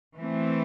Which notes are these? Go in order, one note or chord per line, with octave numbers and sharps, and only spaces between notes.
E3 A3 C4